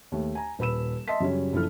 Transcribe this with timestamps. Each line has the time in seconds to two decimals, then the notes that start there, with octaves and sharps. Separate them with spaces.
0.12 D#2 A3
0.35 G#5 A#5
0.59 D#1 B4 B5 E6 E7
1.08 D#5 E5 A5 C6 B6
1.20 F#2 C#3 G3 C#4
1.53 F#1 F3 E4 A4 F6